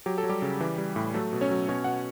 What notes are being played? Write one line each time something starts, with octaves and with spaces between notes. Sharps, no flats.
F#3 G4
A4
F#3
G3 G4
C#3
E3
G3
A2
F#3 A3 A4
B2
C#4 C#5
F#3
B2 C#4 C#5
B2 F#5